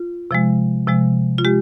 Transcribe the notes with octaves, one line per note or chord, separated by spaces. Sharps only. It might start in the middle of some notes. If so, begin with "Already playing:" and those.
Already playing: F4
C3 F3 G#3
C3 F3 G#3
F4
G#3 G4